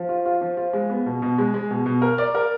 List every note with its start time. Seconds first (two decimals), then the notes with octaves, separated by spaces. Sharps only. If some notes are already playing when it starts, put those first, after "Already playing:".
Already playing: F3
0.09 F4
0.25 F4
0.41 F3
0.57 F4
0.73 G#3
0.90 B3
1.06 B2
1.22 B2
1.38 G#3
1.54 G#3
1.70 B2
1.86 B2
2.02 A#4
2.18 D5
2.34 A#4